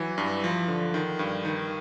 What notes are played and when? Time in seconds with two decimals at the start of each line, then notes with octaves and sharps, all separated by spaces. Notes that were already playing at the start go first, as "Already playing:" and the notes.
Already playing: E3 F#3
0.18 G2
0.44 F3
0.68 D3
0.94 D#3
1.19 G2
1.45 D#3